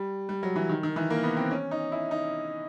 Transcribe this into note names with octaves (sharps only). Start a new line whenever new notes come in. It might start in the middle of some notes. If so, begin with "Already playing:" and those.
Already playing: G3
G3
F#3
E3
D#3
D#3
E3
A#3
B3
C4
C#4
D#4
E4
D#4